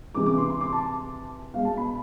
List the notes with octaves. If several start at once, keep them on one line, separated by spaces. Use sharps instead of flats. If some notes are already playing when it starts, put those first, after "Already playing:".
C3 E3 G#3 D6
D6
C6
C6
D6
A5
B2 G#3 F5
A5
B5